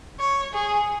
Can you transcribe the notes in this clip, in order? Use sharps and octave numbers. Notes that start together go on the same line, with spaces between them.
C#5
G#4